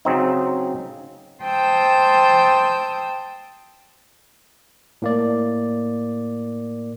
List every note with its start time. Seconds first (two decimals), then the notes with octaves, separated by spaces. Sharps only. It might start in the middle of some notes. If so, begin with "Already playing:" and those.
0.05 C#3 F#3 C4 D#4
1.44 C5 G5 A5 D#6 E6 G6
5.02 A2 A#3 D5